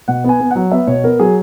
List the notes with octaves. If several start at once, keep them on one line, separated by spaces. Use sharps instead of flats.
B2 F#5
B3 G#5
B3
F#3 F#5
B3 E5
B2 C#5
B3 A#4
F#3 G#4